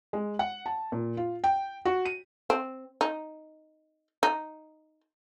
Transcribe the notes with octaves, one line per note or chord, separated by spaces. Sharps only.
G#3
F#5
A5
A#2
F4
G5
F#4
D#7
C4
D#4
D#4